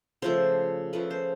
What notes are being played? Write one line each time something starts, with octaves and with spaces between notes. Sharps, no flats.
C#3 F3 A3 C5
C#3 F3 A3 B4
C5